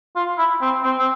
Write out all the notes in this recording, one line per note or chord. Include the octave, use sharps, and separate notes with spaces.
F4
E4
C4
C4
C4